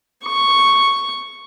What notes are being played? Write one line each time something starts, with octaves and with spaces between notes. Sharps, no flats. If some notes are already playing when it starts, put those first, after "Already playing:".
C#6